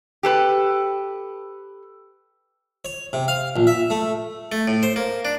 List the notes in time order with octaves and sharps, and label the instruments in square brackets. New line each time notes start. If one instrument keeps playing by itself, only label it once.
[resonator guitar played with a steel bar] G4 A4 B4
[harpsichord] C#5
C3
F5
A#1
E5
A3
A3
A2
C5
A#3
D4